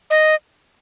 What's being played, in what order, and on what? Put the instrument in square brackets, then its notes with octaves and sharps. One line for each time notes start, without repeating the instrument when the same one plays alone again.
[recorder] D#5